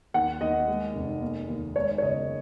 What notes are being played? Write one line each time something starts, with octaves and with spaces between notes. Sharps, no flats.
D#2 F#5
D#2 D#5
G#3
F1
A#3
D#2
G#3 C#5
C#5
F#1 D#5